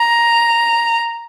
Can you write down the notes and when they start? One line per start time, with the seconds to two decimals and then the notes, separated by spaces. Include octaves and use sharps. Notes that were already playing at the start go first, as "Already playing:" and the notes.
Already playing: A#5